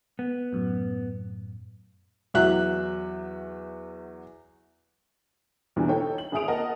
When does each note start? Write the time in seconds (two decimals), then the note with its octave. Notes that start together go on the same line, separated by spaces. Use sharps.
0.19 B3
0.53 F#2 A2
2.34 E2 F#3 E5 F#6
5.76 E2 B2 D3 E3 G3
5.88 D#4 A4 C#5 G5
6.18 F#7
6.32 G#1 G#4 E5 D#6 D7 F7
6.48 A#3 A#4 D#5 F#5 A5